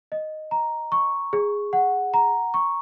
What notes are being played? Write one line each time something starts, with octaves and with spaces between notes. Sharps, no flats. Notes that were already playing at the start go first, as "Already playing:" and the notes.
D#5
A#5
C#6
G#4
F#5
A#5
C#6